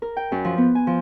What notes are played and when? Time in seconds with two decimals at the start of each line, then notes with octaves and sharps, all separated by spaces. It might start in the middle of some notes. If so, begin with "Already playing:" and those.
0.02 A#4
0.17 G5
0.32 F#2
0.45 F3
0.58 B3
0.75 G#5
0.87 F3